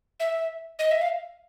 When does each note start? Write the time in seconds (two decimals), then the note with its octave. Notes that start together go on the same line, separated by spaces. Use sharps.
0.20 E5
0.79 D#5
0.91 E5
1.01 F5